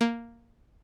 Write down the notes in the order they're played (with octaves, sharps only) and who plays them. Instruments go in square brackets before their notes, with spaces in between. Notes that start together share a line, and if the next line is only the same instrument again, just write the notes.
[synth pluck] A#3